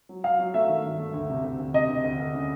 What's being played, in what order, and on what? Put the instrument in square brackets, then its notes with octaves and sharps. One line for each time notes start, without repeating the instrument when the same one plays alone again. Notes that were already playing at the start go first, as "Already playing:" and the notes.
[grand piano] F#3
[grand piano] F#3 [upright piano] F5
[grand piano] F#3
[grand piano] A3 [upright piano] E5
[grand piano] D#3
G2
A3
D2
C3
D2
D2
[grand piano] C3 [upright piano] D#5
[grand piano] D2
D2
D2
C#3